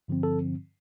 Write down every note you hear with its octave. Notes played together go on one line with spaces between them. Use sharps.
G2 D3 F3 C4
A4